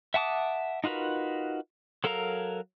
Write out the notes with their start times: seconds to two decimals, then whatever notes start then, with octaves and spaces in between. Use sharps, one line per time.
0.14 E5 F#5 A5 D6 D#6
0.84 D#4 F4 F#4 A#4 B4
2.04 F#3 A4 A#4 F5 A#5